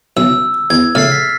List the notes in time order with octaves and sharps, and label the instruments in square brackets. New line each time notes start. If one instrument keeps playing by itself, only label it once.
[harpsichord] B1 F#2 [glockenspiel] E6
[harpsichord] E2 [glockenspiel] G#6
[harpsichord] A#1 C#3 A3 [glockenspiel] F6 A6 C7
[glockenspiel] B6